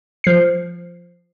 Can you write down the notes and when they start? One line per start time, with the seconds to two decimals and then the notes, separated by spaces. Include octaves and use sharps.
0.24 F3 C7